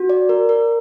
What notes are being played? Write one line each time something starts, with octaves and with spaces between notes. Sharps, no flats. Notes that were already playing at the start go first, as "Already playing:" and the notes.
Already playing: F#4
D5
A#4
A#4